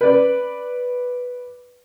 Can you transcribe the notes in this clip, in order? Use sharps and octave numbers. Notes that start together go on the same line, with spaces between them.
B4 D5